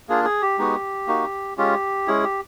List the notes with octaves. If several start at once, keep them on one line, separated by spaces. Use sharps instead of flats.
A#3 D4 F4 G#4
G#4
G4
G#3 B3 D#4 F#4
A#3 D#4 F#4
G#3 C#4 F4 G4
G#3 C#4 E4 G#4
G4